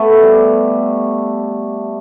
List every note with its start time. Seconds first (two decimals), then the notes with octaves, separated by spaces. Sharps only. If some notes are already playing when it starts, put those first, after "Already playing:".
Already playing: A3 B3
0.23 G3